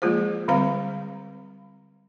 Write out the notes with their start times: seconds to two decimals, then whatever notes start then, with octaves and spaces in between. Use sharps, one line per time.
0.02 F3 G#3 A#3 F4 G#4 C5
0.48 D3 G3 C4 C5 F5 A#5